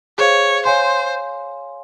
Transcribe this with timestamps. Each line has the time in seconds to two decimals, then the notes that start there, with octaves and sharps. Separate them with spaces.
0.18 G#4 C5 C#5 F5
0.65 C5 C#5 F5 G#5 C6